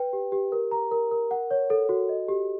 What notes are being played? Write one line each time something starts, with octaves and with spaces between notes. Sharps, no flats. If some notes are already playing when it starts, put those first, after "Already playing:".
Already playing: B4 G5
G4
G4
A#4
A#5
A#4
A#4
F#5
C#5
A4
F#4
D#5
G4